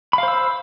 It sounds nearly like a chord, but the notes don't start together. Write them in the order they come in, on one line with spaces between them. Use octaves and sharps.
B5 F5 C5 E6